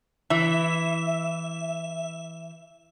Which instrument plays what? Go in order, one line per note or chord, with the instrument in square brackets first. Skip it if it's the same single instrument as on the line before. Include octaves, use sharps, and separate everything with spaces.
[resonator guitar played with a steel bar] E3 [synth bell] E5